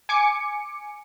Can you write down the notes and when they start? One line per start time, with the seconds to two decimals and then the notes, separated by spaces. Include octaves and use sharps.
0.09 G#5 D6 C#7